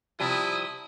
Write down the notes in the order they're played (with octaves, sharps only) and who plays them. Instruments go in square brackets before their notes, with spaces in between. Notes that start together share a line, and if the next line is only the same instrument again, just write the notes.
[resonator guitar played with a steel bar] C3 F3 G3 [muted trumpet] E4 [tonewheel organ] D#6